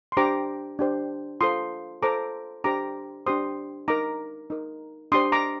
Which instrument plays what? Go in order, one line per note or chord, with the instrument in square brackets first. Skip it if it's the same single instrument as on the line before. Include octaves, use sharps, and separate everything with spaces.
[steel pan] C6
D4 G4 C5 A#5 D6
D4 G4 C5
F4 A4 C5 C6 D#6
F4 A4 C5 A#5 D6
D4 G4 C5 A#5 D6
D4 G4 C5 C6 D#6
D#4 A#4 A#5 D6
D#4 A#4
D4 G4 C5 C6 D#6
A#5 D6